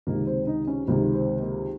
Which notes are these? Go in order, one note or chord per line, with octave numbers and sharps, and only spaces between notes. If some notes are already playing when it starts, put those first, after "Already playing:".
C#2 C3 D#3 A#3
C4
D#4
C#4
C#2 C3 D#3 A#3
C4
A#3